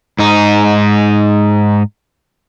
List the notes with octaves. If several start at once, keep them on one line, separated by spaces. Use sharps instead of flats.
G#2 D#4